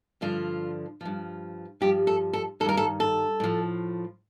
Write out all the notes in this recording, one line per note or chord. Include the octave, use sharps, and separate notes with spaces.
G2 D3 F3 F4
G2 F3
G2 F3 G4
A4
A4
G2 D#3 A4 A#4
A4
A4
A2 F3